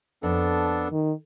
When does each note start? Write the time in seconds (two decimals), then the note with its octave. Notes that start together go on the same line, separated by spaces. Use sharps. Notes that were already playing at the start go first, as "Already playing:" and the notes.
0.23 F2 B3 D4 A4
0.92 D#3